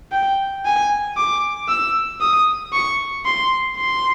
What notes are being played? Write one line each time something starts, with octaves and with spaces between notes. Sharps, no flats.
G5
G#5
D6
E6
D#6
C#6
C6
C6